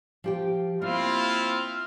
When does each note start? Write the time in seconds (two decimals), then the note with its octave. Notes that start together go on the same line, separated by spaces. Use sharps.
0.24 F3 G4 G5
0.82 A#3 C4 E4 F4 F6